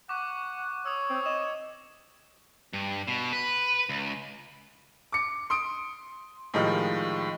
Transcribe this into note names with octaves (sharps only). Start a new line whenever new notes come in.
F#5 C#6 D6
C#5 D#6 E6
C4
D#5 E7
G2
B2
B4
C#2
D6 C#7
C6 D#6 D7
A2 D#3 F3 G3 G#3